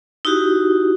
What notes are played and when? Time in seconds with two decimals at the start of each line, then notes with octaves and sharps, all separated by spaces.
0.25 D#4 E4 F#4 G4